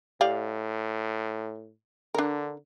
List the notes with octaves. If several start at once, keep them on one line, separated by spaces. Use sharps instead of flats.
A2 G4 D5 F5
D3 D4 A#4